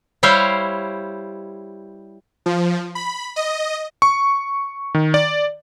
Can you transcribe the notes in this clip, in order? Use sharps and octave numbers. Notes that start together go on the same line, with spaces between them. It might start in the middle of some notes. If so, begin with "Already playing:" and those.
G3 E4 G4 C5 C#5 F5
F3
B5
D#5
C#6
D#3
D5